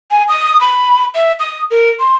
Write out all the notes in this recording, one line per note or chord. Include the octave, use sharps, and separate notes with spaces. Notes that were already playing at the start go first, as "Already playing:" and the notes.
G#5
D#6
B5
E5
D#6
A#4
C6